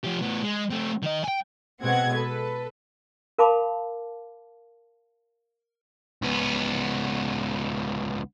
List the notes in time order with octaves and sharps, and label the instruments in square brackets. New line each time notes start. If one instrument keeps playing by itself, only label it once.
[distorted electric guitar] F3 G4
A2 B3
G#3
A3 C4
D#3 D#5
G5 G#5
[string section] B2 G#3 C4 F#5 G#6
A4 B4
[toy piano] A#4 F5 A5 B5 D6
[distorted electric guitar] C#2 B3